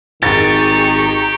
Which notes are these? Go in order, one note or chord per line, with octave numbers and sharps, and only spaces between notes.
G#1 D#3 G4 G#4 A#5 C#6 A6